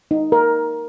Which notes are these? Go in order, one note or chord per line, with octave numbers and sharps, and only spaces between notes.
D#4
A#4